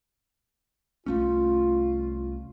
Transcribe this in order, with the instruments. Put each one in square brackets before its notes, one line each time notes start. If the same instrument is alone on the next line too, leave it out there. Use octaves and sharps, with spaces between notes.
[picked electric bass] C2 A3 C#4 [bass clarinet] F4